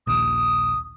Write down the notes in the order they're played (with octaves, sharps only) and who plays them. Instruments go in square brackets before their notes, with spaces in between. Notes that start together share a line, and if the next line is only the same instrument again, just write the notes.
[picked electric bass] A#1 D#2 [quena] D#6